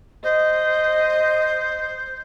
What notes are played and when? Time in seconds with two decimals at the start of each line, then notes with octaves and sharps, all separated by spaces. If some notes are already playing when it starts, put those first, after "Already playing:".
0.24 C5 D#5